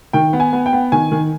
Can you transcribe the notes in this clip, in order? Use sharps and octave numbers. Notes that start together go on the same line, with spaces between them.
D#3 G5
B3
G#5
B3
G5
B3
D#3 G#5
D#3